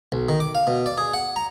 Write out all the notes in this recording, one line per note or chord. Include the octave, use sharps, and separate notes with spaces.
B1
D#3
D6
F5
B2
D5
G#4
F#5
A#5